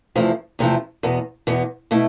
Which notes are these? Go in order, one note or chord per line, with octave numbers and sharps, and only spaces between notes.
E2 C3 F3 A3 E4
E2 C3 F3 A3 E4
E2 B2 B3
E2 B2 B3
B2 A3 E4